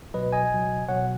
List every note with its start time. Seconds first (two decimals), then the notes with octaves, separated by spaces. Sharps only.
0.14 C#2 B2 F#3 B4 D#5
0.33 D#5 G#5
0.52 C#2 B2 F#3
0.89 C#2 B2 F#3 C#5 F#5